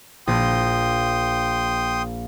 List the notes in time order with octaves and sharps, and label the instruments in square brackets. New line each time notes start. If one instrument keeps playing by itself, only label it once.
[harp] A#1 [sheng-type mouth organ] G5 C6 D#6